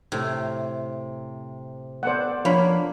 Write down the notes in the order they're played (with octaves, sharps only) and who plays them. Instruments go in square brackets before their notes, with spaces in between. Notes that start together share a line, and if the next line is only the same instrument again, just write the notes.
[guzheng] A2 [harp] C3
[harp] B3 A4 D5 [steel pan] C5 F#5
[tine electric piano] F3 D4 [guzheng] A#3 [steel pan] C#5 F5 B5